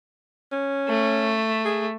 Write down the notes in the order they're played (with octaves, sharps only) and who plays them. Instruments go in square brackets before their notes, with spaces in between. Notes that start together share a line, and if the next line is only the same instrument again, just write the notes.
[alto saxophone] C#4
[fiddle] A3
[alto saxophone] G#4